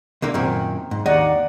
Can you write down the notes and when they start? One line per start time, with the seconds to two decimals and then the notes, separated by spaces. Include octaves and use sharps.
0.22 C#2 D3 A#3
0.34 F#2 A#2 D#3 C4
0.91 G#2
1.06 D#2 D#4 D5 F#5